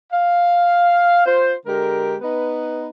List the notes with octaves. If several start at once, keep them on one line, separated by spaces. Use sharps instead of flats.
F5
F4 C5
D3 G#3 G4 A#4
B3 D#4 B4